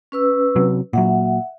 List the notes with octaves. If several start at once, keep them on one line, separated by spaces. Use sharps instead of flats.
C#4 B4 E6
C3 F#3
A#2 F#3 E5 F#5